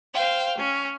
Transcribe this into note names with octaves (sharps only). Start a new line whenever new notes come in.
C5 F5 G5
C#4